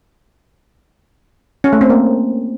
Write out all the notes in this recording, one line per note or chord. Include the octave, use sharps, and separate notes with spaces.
C#4
A3
C4
A#3